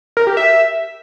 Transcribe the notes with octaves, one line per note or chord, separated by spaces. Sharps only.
A#4
G4
E5